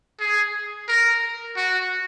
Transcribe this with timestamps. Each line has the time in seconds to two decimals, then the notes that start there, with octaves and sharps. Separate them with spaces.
0.20 G#4
0.89 A#4
1.56 F#4